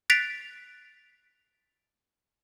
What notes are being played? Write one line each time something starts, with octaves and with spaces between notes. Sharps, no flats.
F#6 A6 B6 C7 D7 F7